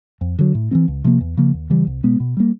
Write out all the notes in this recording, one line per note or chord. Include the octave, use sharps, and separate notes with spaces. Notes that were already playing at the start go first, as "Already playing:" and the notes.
F2
D3 F#3
A2
E3 G3 C4
C#2
C3 F3 A#3
E2
C#3 F3 A#3
D#2
C#3 E3 G3
C2
B2 G#3 B3
B2
G3 A#3